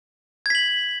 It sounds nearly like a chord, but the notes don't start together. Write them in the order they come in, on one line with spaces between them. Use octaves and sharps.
G#6 B6 F#7